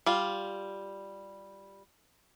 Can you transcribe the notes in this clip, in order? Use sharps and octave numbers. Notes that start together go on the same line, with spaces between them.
G3 F4